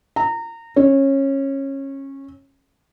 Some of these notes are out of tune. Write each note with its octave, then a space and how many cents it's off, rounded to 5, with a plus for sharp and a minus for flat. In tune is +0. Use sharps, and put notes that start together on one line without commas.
A#5 -25
C#4 -20